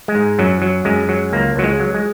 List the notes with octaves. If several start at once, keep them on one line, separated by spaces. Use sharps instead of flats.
G#3
G#2
F#2 F#3
F#3
F#2 G#3
F#3
C#2 A#3
C#2 F#3
G#3
F#3
G#3